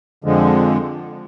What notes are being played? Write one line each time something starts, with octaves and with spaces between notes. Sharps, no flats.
F2 D3 F3 G#3